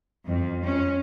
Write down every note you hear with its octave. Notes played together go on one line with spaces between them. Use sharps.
F2
C#4